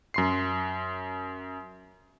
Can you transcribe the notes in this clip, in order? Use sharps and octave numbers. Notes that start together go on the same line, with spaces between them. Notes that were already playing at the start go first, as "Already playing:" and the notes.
F#2 C6 C7